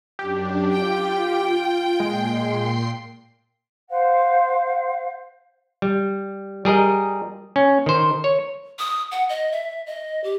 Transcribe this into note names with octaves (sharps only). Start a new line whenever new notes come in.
F#2 D4 G4
F4 G5
A#2 G#3 C6 C7
C5 F5 F#5
G3
G3 G#4 A#4 D#5
C#4
D#3 C5
C#5
D#6
F#5
D#5
E5
D#5
G4